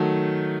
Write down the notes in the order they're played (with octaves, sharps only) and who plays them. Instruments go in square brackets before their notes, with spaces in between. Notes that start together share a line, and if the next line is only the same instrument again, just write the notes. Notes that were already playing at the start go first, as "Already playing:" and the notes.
Already playing: [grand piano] D#3 F#3 A3